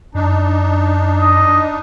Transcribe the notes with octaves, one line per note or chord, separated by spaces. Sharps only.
F#2 D4 D#4
D#5